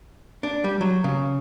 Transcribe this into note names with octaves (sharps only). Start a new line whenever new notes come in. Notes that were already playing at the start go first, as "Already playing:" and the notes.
D4
G3
F#3
C#3